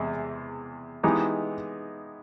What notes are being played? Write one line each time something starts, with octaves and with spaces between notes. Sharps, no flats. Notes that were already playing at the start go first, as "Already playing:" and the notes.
Already playing: E2 C3 G#3
E3 G#3 B3 D#4 G4